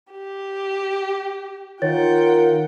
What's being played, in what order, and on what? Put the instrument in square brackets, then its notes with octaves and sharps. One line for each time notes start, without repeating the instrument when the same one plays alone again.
[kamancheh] G4
[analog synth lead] D#3 [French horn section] F4 A#4 [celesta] C#5 A6 [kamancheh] F#5 G5